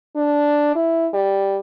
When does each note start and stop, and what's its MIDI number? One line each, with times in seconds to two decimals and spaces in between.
0.16 0.73 62
0.75 1.08 64
1.13 1.59 55